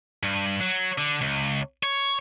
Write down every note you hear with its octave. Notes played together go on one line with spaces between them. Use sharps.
G2
F#3
D3
C#2
C#5